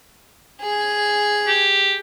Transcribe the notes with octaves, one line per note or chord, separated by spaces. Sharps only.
G#4 G#5
G4